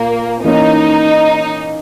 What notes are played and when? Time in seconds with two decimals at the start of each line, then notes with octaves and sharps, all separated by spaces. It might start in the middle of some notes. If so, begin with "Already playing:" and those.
Already playing: A#2 A#3
0.44 E3 A#3 C#4 D#4